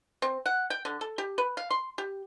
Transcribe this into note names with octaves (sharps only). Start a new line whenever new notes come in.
C4
F#5
G5
D3
A4
G4
B4
F5
C6
G4